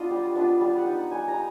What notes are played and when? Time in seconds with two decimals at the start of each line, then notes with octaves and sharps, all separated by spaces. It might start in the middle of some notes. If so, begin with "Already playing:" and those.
Already playing: B3 D4 F4 D#5
0.10 G3
0.36 B3 D4 F4
0.61 G3 F5
0.78 F#5
0.86 B3 D#4
1.11 G3 G#5
1.28 A#5